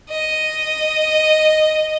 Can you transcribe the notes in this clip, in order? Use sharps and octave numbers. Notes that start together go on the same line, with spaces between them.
D#5